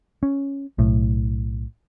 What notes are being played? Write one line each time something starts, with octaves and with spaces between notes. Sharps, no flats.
C#4
B1 A2